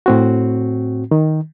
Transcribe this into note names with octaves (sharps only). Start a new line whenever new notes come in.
A2 C4 F#4
D#3